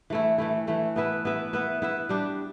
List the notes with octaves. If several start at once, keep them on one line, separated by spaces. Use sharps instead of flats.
E3 A3 E4
E3 A3 E4
E3 A3 E4
B3 E4 B4 E5
B3 E4 B4 E5
B3 E4 B4 E5
B3 E4 B4 E5
G3 D4 G4